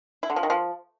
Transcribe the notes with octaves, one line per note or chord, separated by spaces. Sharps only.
E4
D3
F3
D#3
F3